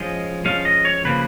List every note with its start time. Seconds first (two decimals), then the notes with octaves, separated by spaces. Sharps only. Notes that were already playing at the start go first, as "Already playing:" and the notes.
Already playing: F3 G#3 C#4 D#5
0.45 F3 G#3 C#4 F5
0.65 D#5
0.85 C#5
1.05 C#3 F3 A#3 B4